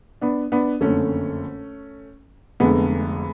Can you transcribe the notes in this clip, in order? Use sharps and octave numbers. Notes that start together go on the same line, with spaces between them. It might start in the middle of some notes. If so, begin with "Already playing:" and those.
B3 D4
B3 D4
F#1 F2 D3 A3 C#4
F1 F2 D3 G#3 B3